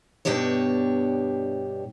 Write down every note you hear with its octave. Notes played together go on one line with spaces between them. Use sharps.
G2 B2 D4 G4 C#5